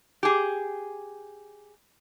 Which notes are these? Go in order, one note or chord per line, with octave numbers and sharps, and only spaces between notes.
G4 G#4